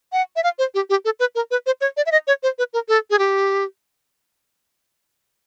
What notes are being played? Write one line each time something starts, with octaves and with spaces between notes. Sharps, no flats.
F#5
E5
F5
C5
G4
G4
A4
B4
A#4
B4
C5
C#5
D5
E5
D#5
C#5
C5
B4
A#4
A4
G#4
G4